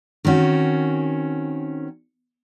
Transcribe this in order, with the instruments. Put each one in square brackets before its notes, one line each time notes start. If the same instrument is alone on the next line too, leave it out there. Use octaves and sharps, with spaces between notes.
[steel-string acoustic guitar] D#3 C4 C#4 F#4